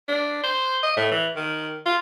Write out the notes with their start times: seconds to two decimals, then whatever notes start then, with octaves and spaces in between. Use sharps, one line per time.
0.08 D4
0.44 C5
0.83 D#5
0.97 A2
1.11 E3
1.36 D#3
1.86 F4